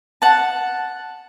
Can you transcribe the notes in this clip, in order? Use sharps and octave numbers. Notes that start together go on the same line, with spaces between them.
F#5 A5